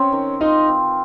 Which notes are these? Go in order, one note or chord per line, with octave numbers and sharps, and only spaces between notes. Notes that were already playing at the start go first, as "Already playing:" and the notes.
Already playing: C4 C#4 C#5
D#3
D#4 F4 D#5
C4